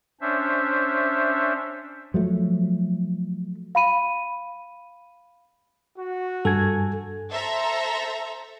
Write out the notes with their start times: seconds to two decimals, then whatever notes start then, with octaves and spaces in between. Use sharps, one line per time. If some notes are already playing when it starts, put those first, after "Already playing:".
0.21 C#4 D4 C5 E5
2.14 F3 F#3 A3
3.75 F5 B5 D#7
5.98 F#4
6.45 G2 A4 G#5 G#6
7.31 A4 C5 E5 A#5